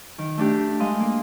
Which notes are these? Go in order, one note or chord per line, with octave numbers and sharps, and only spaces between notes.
D#3
A3 D4 G4
G#3 D#5 F5 C6
A#3